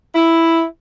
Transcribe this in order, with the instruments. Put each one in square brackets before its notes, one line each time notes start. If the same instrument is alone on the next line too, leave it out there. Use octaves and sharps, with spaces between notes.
[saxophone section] E4